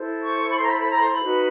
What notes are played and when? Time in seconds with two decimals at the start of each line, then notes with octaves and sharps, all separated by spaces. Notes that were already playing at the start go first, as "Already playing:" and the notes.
Already playing: E4 A4 C5
0.23 C#6
0.50 B5
0.57 C6
0.62 A#5
0.68 B5
0.79 B5
0.90 A#5
0.96 B5
1.00 C6
1.12 B5
1.23 D#4 F#4 B4